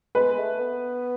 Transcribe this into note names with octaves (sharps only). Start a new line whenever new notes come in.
G#3 B4
A3
B3